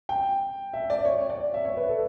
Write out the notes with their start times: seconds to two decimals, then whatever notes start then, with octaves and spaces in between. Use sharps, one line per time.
0.09 G5
0.73 E5
0.90 D5
1.05 C#5
1.30 D5
1.54 E5
1.65 C#5
1.77 B4
1.89 A4